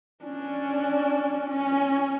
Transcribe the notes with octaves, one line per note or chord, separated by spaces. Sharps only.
C#4 D4
C#4